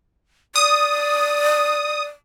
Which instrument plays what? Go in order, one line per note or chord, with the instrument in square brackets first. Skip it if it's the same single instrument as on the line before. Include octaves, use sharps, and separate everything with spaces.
[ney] D5 [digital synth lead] D#6